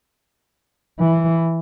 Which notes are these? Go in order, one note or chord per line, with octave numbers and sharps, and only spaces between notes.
E3